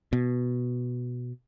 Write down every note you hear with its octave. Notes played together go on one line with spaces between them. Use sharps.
B2